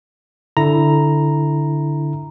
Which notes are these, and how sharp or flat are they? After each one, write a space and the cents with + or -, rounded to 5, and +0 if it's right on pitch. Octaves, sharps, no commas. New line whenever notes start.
D3 +0 E4 +0 A#5 +0